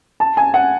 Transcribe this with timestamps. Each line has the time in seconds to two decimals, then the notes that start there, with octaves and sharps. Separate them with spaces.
0.20 A5
0.37 G#5
0.54 F#5